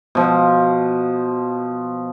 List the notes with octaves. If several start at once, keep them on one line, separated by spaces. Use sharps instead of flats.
B2 F3